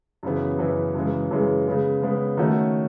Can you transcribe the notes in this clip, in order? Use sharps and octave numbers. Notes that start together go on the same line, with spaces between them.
F#2 C#3 E3 B3
F#2 C#3 E3 B3
F#2 C#3 E3 G#3
F#2 C#3 E3 G#3
C#3 G#3 B3
C#3 G#3 B3
D#3 A3 C#4 F#4